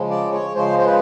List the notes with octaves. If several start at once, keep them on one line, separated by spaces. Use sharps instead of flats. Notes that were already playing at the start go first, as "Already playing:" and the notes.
Already playing: C#3 F3 G#3
D5
C#5
C#3 F3 G#3 C5
C5
B4